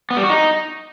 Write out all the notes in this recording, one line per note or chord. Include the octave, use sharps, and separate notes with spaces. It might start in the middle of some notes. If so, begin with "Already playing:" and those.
B3
G3
F#4
D#4